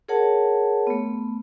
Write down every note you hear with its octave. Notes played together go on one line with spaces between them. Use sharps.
G#4 A#4 C#5 F#5 A5
A3 B3